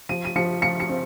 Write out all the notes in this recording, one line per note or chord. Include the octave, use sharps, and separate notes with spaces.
F3 D#7
D#7
F3 C#7
F3 C#7
C#7
C4